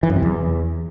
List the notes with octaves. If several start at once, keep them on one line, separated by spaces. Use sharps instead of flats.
E3
F#2
C3
E2